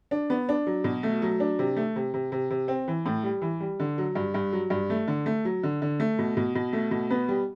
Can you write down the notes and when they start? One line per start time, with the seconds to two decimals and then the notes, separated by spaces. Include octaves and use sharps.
0.11 D4
0.30 B3
0.49 D4
0.67 F#3
0.84 B2
1.03 A3
1.22 F#3
1.40 D4
1.59 C3
1.76 A3
1.96 C3
2.14 C3
2.32 C3
2.50 C3
2.68 C4
2.88 E3
3.06 A2
3.23 G3
3.42 E3
3.61 G3
3.80 D3
3.98 F#3
4.15 G2
4.34 G2
4.53 F#3
4.70 G2
4.90 A3
5.08 D3
5.26 A3
5.45 F#3
5.63 D3
5.82 D3
6.00 A3
6.19 B2
6.37 B2
6.55 B2
6.73 A3
6.91 B2
7.10 B3
7.28 G3